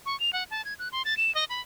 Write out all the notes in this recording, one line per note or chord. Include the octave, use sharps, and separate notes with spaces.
C#6
F7
F#5
A5
G#6
F#6
C6
A6
E7
D#5
B5